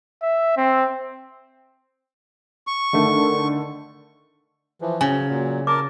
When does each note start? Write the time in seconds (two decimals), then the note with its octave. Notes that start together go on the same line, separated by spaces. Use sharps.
0.22 E5
0.57 C4
2.67 C#6
2.93 D3 D#3 A3
4.81 E3 F3
5.01 C#3 F#3 G#5
5.28 A#2 F#3
5.67 A#4 A5 D6